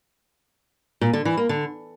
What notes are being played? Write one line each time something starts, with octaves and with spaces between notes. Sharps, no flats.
A#2
D3
E3
A#3
D3